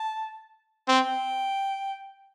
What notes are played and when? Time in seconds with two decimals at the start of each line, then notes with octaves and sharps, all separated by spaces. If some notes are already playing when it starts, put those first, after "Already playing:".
Already playing: A5
0.88 C4 G5